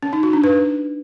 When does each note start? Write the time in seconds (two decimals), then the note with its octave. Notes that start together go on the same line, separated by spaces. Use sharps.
0.03 C#4
0.13 D#4
0.23 F#4
0.33 D4
0.44 B4